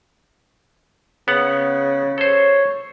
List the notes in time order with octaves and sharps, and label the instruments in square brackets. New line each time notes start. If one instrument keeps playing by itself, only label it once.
[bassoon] C#3 [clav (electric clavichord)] B3 F#5
[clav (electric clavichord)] A4 C5 [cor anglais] C#5